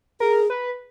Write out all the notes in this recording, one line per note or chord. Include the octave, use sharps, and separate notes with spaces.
G#4 A#4
B4